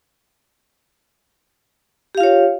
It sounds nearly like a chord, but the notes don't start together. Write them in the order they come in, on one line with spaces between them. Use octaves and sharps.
G4 F5 F4 C#5